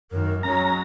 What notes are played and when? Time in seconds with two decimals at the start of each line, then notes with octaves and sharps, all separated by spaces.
0.11 F#2 D#3 A#4
0.43 F#3 G#3 C#4 A#5